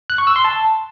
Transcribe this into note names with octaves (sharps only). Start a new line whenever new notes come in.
F#6
C#6
E6
C6
A5